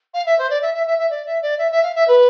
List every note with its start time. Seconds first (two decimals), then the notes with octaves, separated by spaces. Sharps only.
0.14 F5
0.26 E5
0.39 C5
0.50 D5
0.62 E5
0.74 E5
0.87 E5
0.98 E5
1.10 D5
1.26 E5
1.42 D5
1.59 E5
1.72 E5
1.83 F5
1.96 E5
2.08 B4